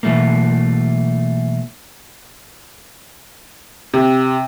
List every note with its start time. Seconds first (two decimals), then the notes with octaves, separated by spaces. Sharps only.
0.03 B2 E3 F#3 A3 A#3
3.94 C3